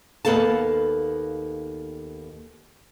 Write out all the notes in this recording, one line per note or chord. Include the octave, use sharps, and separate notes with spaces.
D#2 F3 B3 A4 F5 A5